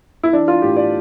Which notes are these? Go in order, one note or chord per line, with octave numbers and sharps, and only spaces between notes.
E4
E3 D4
F4
A2 G4
D5